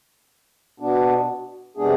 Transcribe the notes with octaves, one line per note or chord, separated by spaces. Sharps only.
B2 B3 D4
C3 G#3 B3 D4 G#4